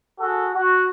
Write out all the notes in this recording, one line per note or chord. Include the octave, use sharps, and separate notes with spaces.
F#4 G#4 A4
F#4